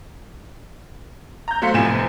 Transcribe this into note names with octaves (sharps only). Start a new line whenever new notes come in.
A#5 G6
F#3 A3 C5 F5 B6 C#7
F1 A2 C3 F3 G#5 E7